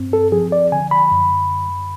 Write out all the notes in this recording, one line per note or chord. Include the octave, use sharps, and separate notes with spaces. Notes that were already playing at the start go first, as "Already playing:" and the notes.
Already playing: G2 C4
A4
F3 G#4
D5
D3 G#5
B5
F#2